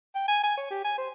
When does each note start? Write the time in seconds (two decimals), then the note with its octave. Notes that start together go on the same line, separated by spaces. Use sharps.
0.15 G5
0.28 G#5
0.43 G#5
0.57 C#5
0.71 G4
0.84 G#5
0.98 C5